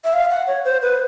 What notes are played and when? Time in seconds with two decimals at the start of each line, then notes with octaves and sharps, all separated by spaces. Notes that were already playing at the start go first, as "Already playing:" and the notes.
0.04 E5
0.13 F5
0.31 F#5
0.47 C#5
0.65 C5
0.82 B4